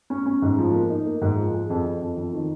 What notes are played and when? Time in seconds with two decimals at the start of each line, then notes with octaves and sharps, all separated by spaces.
0.10 C#4
0.26 C#4
0.42 G#2
0.58 F3
0.74 A#3
0.89 D#4
1.06 A#3
1.21 G#2
1.37 F3
1.53 G#4
1.70 F2
1.85 F2
2.01 F2
2.17 F2
2.33 D#3